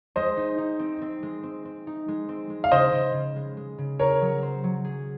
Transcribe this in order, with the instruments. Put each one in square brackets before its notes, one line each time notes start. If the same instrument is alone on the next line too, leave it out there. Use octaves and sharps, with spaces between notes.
[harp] G#3 [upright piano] C5 D#5
[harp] D#4
D#4
C4
C4
G#3
C4
C4
D#4
G#3
C4
G#3
[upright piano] F5
[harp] C#3 [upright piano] C5 D#5
[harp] C#3
C#3
G#3
G#3
C#3
[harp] G#4 [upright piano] A#4 C#5
[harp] F#3
C5
F#3
G#4